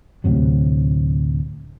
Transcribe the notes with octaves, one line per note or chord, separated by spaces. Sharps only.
D2 A2 C3 F#3